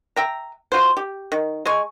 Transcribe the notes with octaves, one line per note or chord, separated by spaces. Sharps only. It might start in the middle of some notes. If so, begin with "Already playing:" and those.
E5 G5 A#5
F4 F#4 C5
G4
D#3
G#3 G#5 C#6